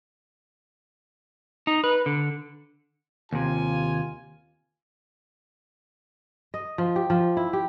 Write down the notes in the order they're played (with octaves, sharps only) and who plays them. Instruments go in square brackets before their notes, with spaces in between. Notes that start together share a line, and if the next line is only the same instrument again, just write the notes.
[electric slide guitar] D#4
B4
D3
[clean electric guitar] D#2 C3 [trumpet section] F4 G#5
[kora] D#5
F3
G4
F3
E4
G4